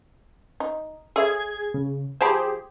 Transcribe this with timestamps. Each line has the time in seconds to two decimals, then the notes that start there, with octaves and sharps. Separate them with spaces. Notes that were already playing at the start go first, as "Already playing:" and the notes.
0.60 D#4
1.16 G#4 A4 C#5 E5 G#6
1.74 C#3
2.21 F3 G4 G#4 C5 A5 B5